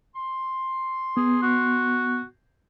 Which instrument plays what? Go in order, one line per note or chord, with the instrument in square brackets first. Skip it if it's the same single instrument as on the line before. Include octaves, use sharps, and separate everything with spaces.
[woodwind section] C6
[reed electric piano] B3 [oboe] G#4
[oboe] F#4